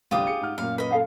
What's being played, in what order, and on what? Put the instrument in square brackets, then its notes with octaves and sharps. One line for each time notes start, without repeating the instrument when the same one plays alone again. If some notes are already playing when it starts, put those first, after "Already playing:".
[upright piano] G1 C2 [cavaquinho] F4 G4 D#6
[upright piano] G#4 C#7
G#2 F#5 F6
[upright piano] F#2 A#2 [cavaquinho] F5
[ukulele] B4 [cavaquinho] D#5 B5
[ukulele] A4 F5 F#5